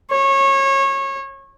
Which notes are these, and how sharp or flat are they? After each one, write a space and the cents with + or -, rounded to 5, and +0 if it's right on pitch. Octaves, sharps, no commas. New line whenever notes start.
C#5 -25